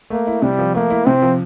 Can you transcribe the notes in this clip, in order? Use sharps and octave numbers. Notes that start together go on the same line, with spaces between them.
A3 A#3
E4
C3 G3
F3
A3 A#3
E4
C3 C4
F3